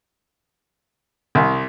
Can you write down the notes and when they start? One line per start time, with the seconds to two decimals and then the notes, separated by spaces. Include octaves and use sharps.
1.35 C2